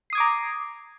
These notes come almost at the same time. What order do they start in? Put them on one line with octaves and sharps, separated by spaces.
C7 D#6 G#6 D6 A#5